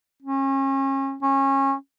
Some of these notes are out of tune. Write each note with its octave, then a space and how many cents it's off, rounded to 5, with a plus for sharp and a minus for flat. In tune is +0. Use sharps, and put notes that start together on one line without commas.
C#4 -35
C#4 -25